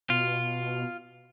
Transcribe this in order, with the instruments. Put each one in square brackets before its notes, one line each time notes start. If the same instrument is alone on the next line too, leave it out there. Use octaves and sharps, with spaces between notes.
[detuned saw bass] B2 [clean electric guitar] F4